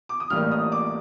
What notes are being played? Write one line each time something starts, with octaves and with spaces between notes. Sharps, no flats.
D6
D#6
A1 A2 G3 A#3 F6
D#6
D6